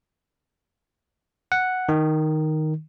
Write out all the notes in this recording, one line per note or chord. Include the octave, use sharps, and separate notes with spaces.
F#5
D#3